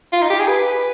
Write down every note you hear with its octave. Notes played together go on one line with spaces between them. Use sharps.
F4
D#4
G4
G#4
B4